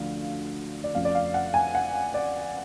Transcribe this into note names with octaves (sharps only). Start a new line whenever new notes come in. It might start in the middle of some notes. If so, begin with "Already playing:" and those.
Already playing: D2 D3 F3 A3 F5
D5
F2 F3 A3 C#4 F5
D5
F5
F#5
G#5
F#5
D5